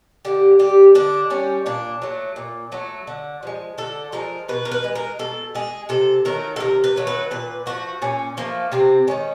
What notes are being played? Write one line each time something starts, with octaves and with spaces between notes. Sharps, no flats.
D3 G4
G3 G4
D3 D4
G3 C#4
A#2 D4
F#3 A3
A#2
F#3 A3
D3
F3 G#3
D3 A4
F3 G#3 A#4
B2 B4
A#4
B4
G#3
A#4
B2 A4
G#3 G#4
C3 A4
D#3 F#3 A3 A#4
A4
C3 A#4
B4
D#3 F#3 A3
B4
A#2 B4
F3 A3 F#4
A#2 C#4
F3 A3 A#3
C3 C4
D#3 G#3 C#4